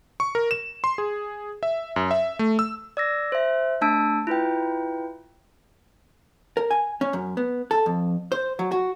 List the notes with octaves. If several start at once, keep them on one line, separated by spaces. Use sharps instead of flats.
C#6
A#4
E7
C6
G#4
E5
F#2
E5
A3
E6
D5 E6 A#6
C5 E5
A3 D4 A5 E6 D7
E4 F4 B4 G5
A#4
G#5
C#4
F#2
B3
A4
F2
C5
F#3
F#4